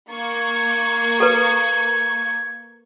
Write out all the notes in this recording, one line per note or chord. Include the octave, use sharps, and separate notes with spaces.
A#3 C#6 G#6
A4 B4